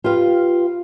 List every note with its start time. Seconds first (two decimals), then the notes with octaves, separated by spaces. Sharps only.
0.04 F4 G4 B4 F5